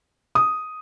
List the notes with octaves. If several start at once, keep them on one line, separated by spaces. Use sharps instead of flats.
D#6